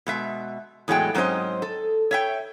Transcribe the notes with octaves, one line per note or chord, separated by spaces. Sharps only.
B2 G#3 E5
E2 A2 F#3 G#3 G5
G#2 F#3 C4 C#4 C5 D#5
A4
C#5 E5 G5